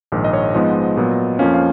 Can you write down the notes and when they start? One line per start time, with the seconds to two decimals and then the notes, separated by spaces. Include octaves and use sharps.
0.12 A#1 G#2 D#3
0.24 D#5
0.33 C#5
0.54 G#2 F3 G#3 B3 D#5
0.97 A#2 F#3 B3
1.39 F2 F3 A#3 C#4 F5
1.54 F5